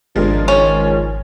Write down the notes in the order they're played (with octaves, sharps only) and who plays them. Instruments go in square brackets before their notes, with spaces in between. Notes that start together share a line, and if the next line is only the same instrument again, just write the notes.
[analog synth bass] G#1 [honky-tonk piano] F3 G#3 A#4 [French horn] D4
[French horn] D#3 [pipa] C#4